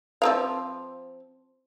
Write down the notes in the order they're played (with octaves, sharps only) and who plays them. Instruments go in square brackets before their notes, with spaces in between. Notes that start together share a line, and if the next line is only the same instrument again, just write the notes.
[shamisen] F3 C4 F5